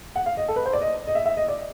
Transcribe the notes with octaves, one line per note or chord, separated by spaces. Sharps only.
F#5
F5
D#5
A4
B4
C5
D5
D#5
D#5
E5
E5
D#5
D5